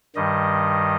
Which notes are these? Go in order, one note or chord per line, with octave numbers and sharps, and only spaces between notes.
G2 D#3 G3 D#5